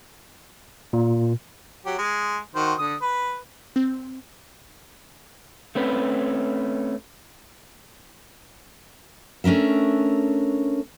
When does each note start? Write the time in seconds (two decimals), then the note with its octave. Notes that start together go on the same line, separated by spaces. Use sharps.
0.93 A#2
1.86 F#3 G4
1.98 G#3
2.55 D#3 F#4 C5
2.78 D3 D#6
3.02 B4
3.76 C4
5.75 A3 C4 C#4 B4
9.44 A3 C#4 D4 A#4 E5